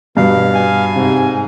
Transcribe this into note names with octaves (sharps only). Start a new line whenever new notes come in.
G2 B2 F5
G#5
G#2 C3